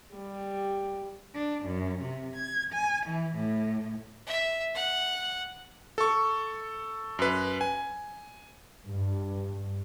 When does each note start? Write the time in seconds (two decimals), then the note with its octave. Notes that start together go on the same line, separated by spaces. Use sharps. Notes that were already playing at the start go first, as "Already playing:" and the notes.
0.15 G3
1.34 D4
1.64 F#2
2.01 C3
2.35 G#6
2.73 G#5
3.06 E3
3.35 A2
4.26 E5
4.74 F#5
5.98 A4 C#6
7.19 F#2 B4
7.61 G#5
8.86 G2